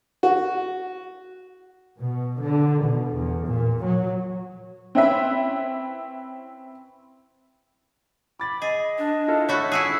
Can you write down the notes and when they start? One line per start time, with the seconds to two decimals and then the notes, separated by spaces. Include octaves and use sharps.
0.23 F#4
2.00 B2
2.41 D3
2.84 B2
3.14 E2
3.48 A#2
3.85 F#3
4.95 C4 C#4 E4 B4 E5
8.40 B5 D6 A6
8.62 G#4 D#5
8.98 D4
9.28 E4 F4 A4
9.49 A3 F#4 C#5 B5 F#6
9.72 E4 F#4 G#4 E6